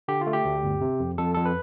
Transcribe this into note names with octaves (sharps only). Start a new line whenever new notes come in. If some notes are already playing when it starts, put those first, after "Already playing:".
D3 G4
F4
A3
G4
D2
G1
C3
F2
F2 A4
F2 A4
B4